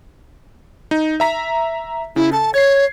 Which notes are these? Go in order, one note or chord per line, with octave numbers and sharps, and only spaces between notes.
D#4
E5 A#5 B6
C#3 E4
A4 A5
C#5 G#6 C7